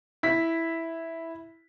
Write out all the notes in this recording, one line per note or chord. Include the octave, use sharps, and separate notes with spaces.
E4 B6